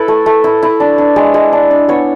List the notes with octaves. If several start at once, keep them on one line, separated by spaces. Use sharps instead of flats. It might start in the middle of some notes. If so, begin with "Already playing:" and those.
Already playing: E4 A4 B4
A3
A3
E4
E4
D4
D4
G#3
G#3
D4
D4
B3 C#5